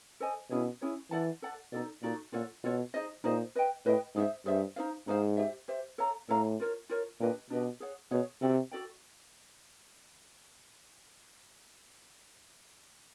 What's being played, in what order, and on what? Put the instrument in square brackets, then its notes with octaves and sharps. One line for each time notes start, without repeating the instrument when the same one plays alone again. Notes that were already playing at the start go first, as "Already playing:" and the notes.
[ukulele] A4 C5 D#5 G#5
[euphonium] B2 [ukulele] C#4 E4 G#4 C#5
[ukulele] C#4 E4 G#4 C#5
[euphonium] E3 [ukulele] A4 D5 F#5 A5
[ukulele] A4 D5 F#5 A5
[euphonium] B2 [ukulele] D#4 F#4 A4 D5
[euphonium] A#2 [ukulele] D#4 F#4 A4 D5
[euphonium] A#2 [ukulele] F4 A4 C#5 F#5
[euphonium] B2 [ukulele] F4 A4 C#5 F#5
[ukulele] D#4 G#4 C5 D#5
[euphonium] A#2 [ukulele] D#4 G#4 C5 D#5
[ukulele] B4 D#5 G5
[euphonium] A2 [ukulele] B4 D#5 G5
[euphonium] G#2 [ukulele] G#4 C5 E5
[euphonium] G2 [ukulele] G#4 C5 E5
[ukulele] D#4 G#4 C5 F5
[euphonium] G#2 [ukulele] D#4 G#4 C5 F5
[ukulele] G4 C5 E5
G4 C5 E5
A4 C#5 F5 A#5
[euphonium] A2 [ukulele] A4 C#5 F5 A#5
[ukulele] F4 A#4 C#5
F4 A#4 C#5
[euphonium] A#2 [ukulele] D4 G4 B4 D#5
[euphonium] B2 [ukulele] D4 G4 B4 D#5
[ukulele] G#4 C#5 F#5
[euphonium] B2 [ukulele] G#4 C#5 F#5
[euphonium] C3 [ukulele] F#4 A4 D5 G5
[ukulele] F#4 A4 D5 G5